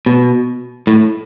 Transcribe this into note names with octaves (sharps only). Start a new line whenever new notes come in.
B2
A2